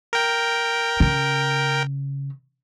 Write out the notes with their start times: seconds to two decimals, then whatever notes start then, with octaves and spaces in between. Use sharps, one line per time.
0.13 A#4 G5
1.00 C#3